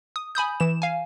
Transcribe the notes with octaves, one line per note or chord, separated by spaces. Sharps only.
D#6
G#5 B5 D#6 G6
E3 E7
F5 G#5